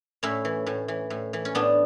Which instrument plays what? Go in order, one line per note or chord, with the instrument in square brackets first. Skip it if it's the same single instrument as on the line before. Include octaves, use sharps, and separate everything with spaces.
[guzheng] A2 C#4 E4
E3
A2
E3
A2
E3
C#4
A2 B3 D4